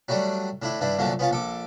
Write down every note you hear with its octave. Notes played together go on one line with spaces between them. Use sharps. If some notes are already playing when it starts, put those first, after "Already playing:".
F#3 G3 A3 D4
A2 D4 E4
G2 D4 E4
C2 A#2 D3 F#3 A3 A5
B3 C#4 F4 A5
A#1 A4 D6